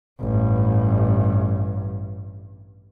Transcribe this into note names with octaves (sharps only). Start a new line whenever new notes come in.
A1 G2